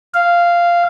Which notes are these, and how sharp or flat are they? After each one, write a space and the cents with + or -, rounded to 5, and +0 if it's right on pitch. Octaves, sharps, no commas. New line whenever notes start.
F5 -10